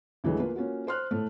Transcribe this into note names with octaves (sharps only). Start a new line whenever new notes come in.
D2 E3 F#3 G#3 A3
A#3 F4 B4
A#3 C#4 F4 F#4
C5 C6 F6 F#6
A2 A3